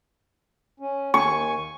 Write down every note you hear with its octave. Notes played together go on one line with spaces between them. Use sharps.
C#4
D#2 G#5 C#6